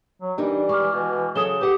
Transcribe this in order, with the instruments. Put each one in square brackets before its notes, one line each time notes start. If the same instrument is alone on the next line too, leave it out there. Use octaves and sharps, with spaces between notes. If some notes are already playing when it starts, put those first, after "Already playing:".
[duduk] F#3
[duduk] E3 [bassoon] G3 [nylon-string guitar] D4 D#4 A#4 [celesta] D5
[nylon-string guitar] G#3 [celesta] C#6 D6 F6
[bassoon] B2
[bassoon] C#3 [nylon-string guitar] F#3 A4 C#5 [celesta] D#6 E7 G7
[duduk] G4 [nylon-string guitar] B4 F#5